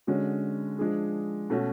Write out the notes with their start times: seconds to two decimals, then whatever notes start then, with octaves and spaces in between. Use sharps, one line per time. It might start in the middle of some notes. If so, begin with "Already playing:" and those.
0.07 D3 G#3 C#4 F#4
0.79 F3 G#3 D4 G#4
1.50 B2 A3 C#4 F#4